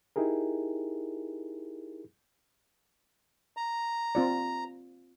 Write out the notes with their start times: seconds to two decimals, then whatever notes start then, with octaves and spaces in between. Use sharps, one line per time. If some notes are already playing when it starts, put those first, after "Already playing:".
0.16 D#4 E4 G4 G#4 A#4
3.57 A#5
4.15 C4 F4 D5